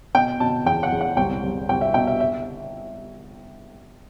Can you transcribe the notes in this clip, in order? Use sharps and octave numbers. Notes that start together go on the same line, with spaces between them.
B2 G5
B2 A5
E2 G5
F#5
E2
F#5
C2 G5
C2
C2 G5
E5
B2 G5
E5
E5